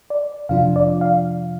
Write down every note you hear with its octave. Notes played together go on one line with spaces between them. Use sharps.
D5
F2 C3 F3 D4 F4 F5
D5
F5